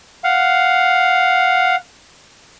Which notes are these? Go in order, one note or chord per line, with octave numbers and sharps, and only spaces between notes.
F5 F#5